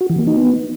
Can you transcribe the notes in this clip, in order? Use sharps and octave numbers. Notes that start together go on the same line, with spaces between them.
F#4
E3
A#3
D#4
B3